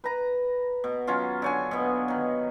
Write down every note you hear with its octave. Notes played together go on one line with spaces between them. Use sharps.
B4 A#5
B2
F#3 C#4 F4
D3 C#5 G#5
B2 B3
D#3 F#3